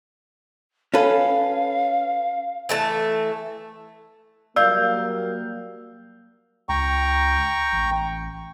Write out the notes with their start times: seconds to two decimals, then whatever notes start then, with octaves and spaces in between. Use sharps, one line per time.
0.94 C#4 A4 B4 F5
2.69 E3 A3 A5
4.56 F#3 G3 A#3 D5 F5 E6 G6
6.69 C#2 G5 A#5 C#6
7.72 A1